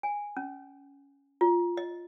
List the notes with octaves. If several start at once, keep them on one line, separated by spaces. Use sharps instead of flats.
G#5
C#4
F4
D#5